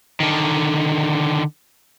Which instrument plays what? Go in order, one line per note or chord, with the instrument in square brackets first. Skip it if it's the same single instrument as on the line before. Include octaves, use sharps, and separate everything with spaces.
[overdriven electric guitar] D3 D#3